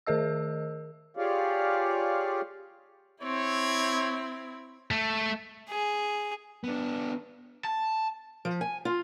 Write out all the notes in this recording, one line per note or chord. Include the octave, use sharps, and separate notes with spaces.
D#3 G#4 A#4 D#5 E6
F4 G4 G#4 C#5 D5 F5
C4 E4 C#5
A3
G#4
B3 D4
A5
F3
G#5
F4